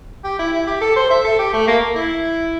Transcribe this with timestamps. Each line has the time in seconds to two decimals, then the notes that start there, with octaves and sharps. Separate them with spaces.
0.24 G4
0.39 E4
0.53 E4
0.67 G4
0.81 A4
0.96 C5
1.10 E5
1.24 A4
1.39 G4
1.53 A3
1.68 A#3
1.96 E4